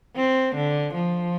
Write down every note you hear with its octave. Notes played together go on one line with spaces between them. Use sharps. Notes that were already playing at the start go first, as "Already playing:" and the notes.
C4
D3
F3